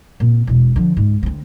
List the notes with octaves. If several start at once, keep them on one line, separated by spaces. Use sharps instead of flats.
A#2 C4
E1 B2
D3 F3
C#2 G#2
D2 C4